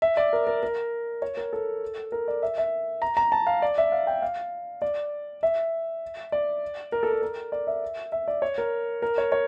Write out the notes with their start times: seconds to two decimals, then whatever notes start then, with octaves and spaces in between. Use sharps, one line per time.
0.02 E5
0.17 D5
0.33 A#4
0.47 A#4
0.63 A#4
1.22 C#5
1.37 A#4
1.53 A4
2.12 A#4
2.28 D5
2.42 E5
2.58 E5
3.02 A#5
3.17 A#5
3.32 A5
3.47 F5
3.62 D5
3.78 E5
3.92 F5
4.07 G5
4.22 F5
4.82 D5
5.43 E5
6.32 D5
6.92 A#4
7.03 A4
7.12 A#4
7.22 A#4
7.52 D5
7.67 E5
8.12 E5
8.28 D5
8.42 C#5
8.58 A#4
9.02 A#4
9.18 C#5
9.32 C#5